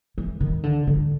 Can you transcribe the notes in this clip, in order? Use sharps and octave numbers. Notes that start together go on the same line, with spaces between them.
E3
D#3
D3
D3